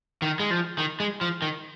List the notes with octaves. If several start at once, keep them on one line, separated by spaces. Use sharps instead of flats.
D#3
G#3
F3
D#3
G#3
F3
D#3